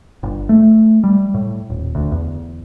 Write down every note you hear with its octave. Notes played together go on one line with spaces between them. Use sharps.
G1
A3
G3
A2
D#1
D2
E2